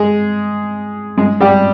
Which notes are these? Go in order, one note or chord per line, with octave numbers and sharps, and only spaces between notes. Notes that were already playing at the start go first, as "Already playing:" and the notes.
Already playing: G#3 G#4
G#3 G#4
G3 G4